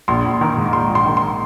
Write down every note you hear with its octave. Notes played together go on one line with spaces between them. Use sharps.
A#1 C6
A#1
D#3
G#2
A#1 C6
A#1
C6
D#3
C6